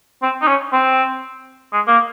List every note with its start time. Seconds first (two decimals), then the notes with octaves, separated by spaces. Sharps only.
0.23 C4
0.42 D#4
0.48 C#4
0.73 C4
1.72 G#3
1.87 A#3